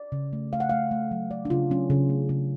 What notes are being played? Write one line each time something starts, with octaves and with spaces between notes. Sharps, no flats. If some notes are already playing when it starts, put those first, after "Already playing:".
Already playing: D5
C#3
A3
A3 F5
F#5
A3 F5
A3
F#3
A3 D5
D4
C#3 F4
F#3 C#4
C#3
A3
C#3